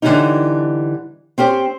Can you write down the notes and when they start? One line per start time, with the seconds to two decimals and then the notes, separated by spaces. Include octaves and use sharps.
0.02 D3 E3 F3 G3 C#4 D#4
1.38 C4 C#4 G4 C5